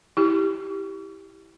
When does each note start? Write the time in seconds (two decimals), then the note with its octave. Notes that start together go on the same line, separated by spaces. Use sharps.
0.17 E4 G4